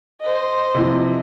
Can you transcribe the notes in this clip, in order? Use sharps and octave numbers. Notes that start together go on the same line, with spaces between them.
C5 D#5
C3 E3 F3